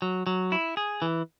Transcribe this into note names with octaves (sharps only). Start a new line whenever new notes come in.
F#3
F#3
E4
G#4
E3